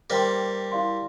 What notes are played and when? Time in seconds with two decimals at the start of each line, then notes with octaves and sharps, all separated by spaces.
0.10 G3 A#3 C5 G5 C6
0.72 E4 G4 D5 F5 C6